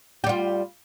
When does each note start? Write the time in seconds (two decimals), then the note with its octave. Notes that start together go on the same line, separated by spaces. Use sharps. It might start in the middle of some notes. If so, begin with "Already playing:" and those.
0.24 G4
0.26 G3
0.29 F4